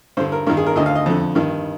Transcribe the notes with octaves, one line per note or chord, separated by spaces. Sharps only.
G2 D3 C5
A#4
G2 D#3 A#4
G#4
A#4
D2 D3 D#5
F5
D#5
F2 D3
G2 D#3